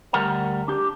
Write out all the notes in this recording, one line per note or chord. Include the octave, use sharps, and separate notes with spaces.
D2 G3 A#4 F#5 A#5
D4 G4